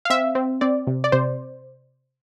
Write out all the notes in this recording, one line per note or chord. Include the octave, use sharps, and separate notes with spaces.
F5
C4 E5
C4
C4 D5
C3
D5
C3 C5